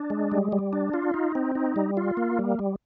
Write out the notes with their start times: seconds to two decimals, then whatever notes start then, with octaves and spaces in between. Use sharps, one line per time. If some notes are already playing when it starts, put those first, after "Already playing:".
Already playing: D4
0.10 G#3
0.32 G3
0.52 G3
0.73 D4
0.94 F4
1.14 D#4
1.35 C4
1.55 D#4
1.76 G3
1.97 F4
2.17 A#3
2.39 G3
2.59 G3